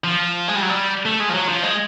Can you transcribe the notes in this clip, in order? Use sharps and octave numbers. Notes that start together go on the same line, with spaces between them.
F3
G#3
G3
F#3
G3
A3
G#3
F3
F#3
F3
G#3